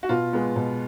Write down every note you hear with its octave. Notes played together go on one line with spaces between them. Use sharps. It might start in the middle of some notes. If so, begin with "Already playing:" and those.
F#4
B2 F4
G#3 B3
B2